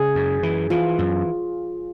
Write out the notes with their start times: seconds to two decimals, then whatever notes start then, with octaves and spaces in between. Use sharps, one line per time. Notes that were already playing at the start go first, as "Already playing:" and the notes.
Already playing: C#3 G#4
0.15 F#2
0.43 E3
0.70 E3 F4
0.99 F#2